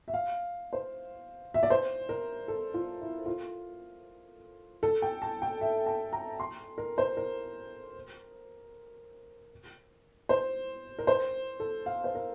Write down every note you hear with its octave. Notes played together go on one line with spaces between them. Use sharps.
E5
F5
C5
E5
D5
C5
A#4
A4
F4
E4
F4
A4
G5
A5
G5
E5
A5
A#5
C6
A#4
C5
A#4
C5
A#4
C5
A4
F5
C5
A#4